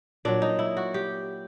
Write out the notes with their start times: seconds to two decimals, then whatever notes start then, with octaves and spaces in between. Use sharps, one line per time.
0.25 A#2 F#3 D4
0.42 D#4
0.59 E4
0.77 F#4
0.94 G4